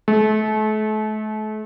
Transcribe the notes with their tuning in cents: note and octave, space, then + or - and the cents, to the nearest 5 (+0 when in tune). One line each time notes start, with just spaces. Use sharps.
A3 -40